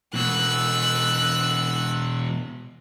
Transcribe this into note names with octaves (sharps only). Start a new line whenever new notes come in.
B2 E3 E6 F#6